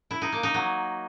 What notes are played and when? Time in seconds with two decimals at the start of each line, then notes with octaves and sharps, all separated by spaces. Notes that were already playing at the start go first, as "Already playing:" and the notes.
0.11 E4
0.21 D#4
0.32 A#3
0.43 D#4
0.54 F#3